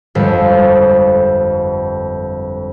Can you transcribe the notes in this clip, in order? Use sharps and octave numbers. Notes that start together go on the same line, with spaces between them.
G1 F2 G#3 A4